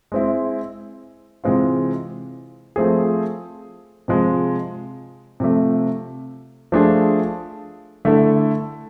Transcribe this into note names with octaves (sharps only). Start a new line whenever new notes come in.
G#3 C4 E4
C3 E3 G#3 C4 F4
F3 A3 C4 G#4
C3 F3 G#3
C3 F3 A3
F3 A3 D4 F4 G#4
D3 A3 E4 A4